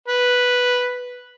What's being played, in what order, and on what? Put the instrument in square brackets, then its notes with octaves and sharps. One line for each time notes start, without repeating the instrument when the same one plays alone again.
[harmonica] B4